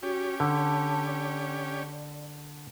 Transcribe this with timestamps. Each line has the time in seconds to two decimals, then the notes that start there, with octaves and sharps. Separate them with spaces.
0.03 C#4 F#4 G4
0.40 D3 A5
1.06 D5